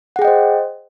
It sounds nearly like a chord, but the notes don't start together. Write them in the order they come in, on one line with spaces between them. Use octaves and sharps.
F#5 G#4 G5 D#5 C5